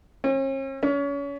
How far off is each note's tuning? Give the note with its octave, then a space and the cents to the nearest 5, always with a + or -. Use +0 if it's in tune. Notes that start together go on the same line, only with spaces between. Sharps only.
C#4 -45
C#4 +30